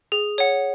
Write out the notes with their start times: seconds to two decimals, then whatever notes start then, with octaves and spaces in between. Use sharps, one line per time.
0.12 G#4
0.38 C#5 F#5